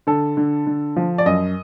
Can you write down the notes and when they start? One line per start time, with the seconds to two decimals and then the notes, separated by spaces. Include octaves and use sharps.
0.07 D3 A4
0.37 D3
0.67 D3
0.96 F3
1.18 D5
1.26 F#2 D#5